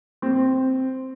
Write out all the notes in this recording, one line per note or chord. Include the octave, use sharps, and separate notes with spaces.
C4